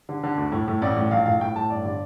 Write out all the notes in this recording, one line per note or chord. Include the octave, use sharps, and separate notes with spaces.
D3
D3
D2
A2
A2
A1 D5
A2
A#1 F5
A2 F5
A2 G5
A2 A5
G1 D5
D3 D5